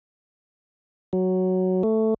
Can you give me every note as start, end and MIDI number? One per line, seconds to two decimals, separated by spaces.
1.13 1.83 54
1.83 2.14 57